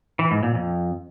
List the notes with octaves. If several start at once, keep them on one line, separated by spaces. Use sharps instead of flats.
E3
G#2
A#2
F2